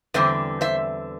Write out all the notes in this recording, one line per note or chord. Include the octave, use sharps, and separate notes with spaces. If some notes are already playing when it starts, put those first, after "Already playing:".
E2 D3 G3 C4 C5 E5
C5 E5